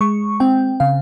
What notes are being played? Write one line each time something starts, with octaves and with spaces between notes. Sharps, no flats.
G#3 C#6
C4 G5
C#3 F5